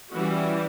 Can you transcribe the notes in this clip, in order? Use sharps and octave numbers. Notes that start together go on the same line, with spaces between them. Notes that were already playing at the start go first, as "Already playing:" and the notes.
E3 G3 C#4 F#4